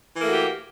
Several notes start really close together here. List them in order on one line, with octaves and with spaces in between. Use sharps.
E3 A#3 A3 F#4 G4